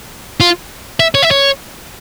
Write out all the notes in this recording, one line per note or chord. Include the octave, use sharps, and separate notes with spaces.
F4
E5
C#5
E5
C#5